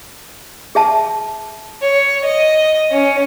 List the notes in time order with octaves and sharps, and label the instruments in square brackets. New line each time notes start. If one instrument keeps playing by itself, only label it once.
[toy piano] G#4 E5 A5
[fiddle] C#5
D#5
C#4